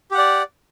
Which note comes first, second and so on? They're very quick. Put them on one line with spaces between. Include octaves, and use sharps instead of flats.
G4 F#5 D5